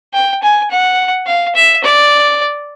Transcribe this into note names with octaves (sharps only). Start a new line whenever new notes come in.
G5
G#5
F#5
F5
E5
D5